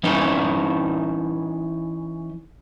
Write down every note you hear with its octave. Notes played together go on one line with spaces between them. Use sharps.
E3 C#4 D#4 B4